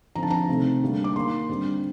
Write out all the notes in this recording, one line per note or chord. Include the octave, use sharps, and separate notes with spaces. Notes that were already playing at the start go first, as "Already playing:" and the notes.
D3 F3 C4 A#5
A5
A#5
C3 D#3 A3 C4
D3 G3 A#3
D6
D#3 A#3 C6
D3 G3 C4